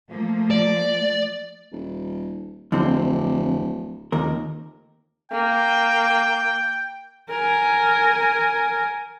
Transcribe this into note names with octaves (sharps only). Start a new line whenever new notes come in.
F3 A3 A#3
D5
D#1
D1 F2 D3 C4
F1 D#2 A#4
A#3 G5
A#4 G#5